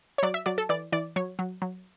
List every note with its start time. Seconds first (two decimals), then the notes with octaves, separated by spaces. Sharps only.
0.18 C#5
0.23 F#3 D5
0.34 E5
0.46 F#3 D5
0.58 A4
0.69 E3 D5
0.92 E3 D5
1.16 F#3 C#5
1.39 F#3
1.62 F#3